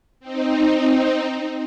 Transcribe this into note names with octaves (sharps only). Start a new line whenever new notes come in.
C4 D#4